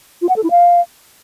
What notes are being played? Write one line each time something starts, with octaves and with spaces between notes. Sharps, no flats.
F4
F#5
A4
E4
F5